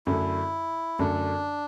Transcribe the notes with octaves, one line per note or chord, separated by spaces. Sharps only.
F#2 D3 A3 E4
F#2 D3 A3 D4